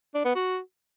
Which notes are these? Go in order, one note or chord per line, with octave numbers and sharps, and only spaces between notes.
D4
B3
F#4